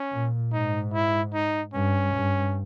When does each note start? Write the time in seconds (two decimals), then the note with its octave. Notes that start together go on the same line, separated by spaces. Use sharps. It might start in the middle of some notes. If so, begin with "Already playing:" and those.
Already playing: C#4
0.12 A#2
0.53 G#2 D#4
0.94 E4
1.34 D#4
1.74 G2 C#4
2.15 G2